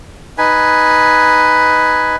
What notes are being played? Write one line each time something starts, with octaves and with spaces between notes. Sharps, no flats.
D#4 B4 G#5